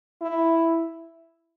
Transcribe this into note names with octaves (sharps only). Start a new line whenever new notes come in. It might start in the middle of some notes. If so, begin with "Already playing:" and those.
E4